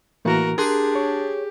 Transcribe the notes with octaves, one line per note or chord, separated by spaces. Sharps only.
A2 E3 A#3 F#4 A#4
D4 G4 G#4 A#4 C6 F#6
C#5